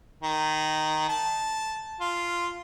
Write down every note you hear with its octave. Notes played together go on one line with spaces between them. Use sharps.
D#3
A5
F4